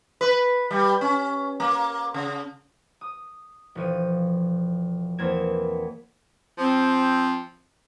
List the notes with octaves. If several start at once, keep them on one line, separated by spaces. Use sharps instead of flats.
B4
G3
C#4
A#3
C#3
D#6
E1 F3 D#7
E2 A#3 C4 G#6 E7
F3 C4